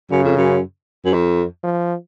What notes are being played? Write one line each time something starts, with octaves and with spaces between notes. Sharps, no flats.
F#2 C#3
F2
F#2
F#2
F2
F3